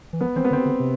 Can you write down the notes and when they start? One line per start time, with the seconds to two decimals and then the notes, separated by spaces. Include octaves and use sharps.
0.13 E3
0.21 F3 B3
0.36 E3 C4
0.45 B3
0.51 D3 C4
0.65 D3
0.80 C3